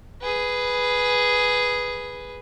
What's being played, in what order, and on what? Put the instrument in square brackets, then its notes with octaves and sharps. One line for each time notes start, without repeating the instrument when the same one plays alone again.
[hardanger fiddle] G#4 B4